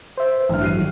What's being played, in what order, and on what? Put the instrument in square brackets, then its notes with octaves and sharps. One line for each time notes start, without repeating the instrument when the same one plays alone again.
[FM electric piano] C5 E5
[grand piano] B4
A1 G2 F6
[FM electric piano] F#3 [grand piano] F#6 C7 D#7
[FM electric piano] D#3 E3 G3 [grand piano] F#4 G4